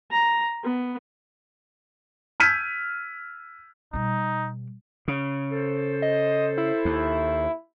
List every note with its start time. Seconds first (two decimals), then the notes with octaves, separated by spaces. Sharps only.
0.11 A#5
0.64 B3
2.40 E6 F6 G6 G#6 B6 D#7
3.93 B2 G3 D#4
5.08 C#3
5.51 A4 C5
6.02 D#5
6.58 E4
6.85 D#2